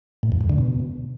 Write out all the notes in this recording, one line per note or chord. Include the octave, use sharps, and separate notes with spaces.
A2
E2
G#2
D3
B2